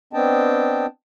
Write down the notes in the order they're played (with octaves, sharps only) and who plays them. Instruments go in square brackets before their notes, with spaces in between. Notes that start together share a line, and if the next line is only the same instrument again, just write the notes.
[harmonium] B3 C4 D4 D#5 G5 A5